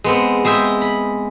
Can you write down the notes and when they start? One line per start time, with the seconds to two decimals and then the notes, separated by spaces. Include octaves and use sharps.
0.04 G#3 B3 C4
0.45 G#3 G#4 E5 G5
0.81 B5